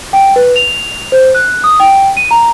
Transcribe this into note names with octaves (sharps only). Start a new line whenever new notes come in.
G5
B4
F7
C5
F#6
D#6
G5
D#7
A#5